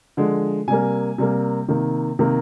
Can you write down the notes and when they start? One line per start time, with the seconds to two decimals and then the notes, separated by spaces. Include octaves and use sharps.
0.17 D3 F3 G#3
0.67 C3 G3 A#3 G#5
1.18 C3 G3 A#3
1.68 C3 D#3 A#3
2.19 C3 D#3 A#3